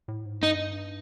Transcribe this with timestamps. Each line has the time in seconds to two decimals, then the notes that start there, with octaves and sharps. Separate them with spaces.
0.08 A2
0.26 G#2
0.42 G2 D#4